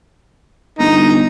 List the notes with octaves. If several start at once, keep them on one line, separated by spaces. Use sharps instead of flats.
G1 D#4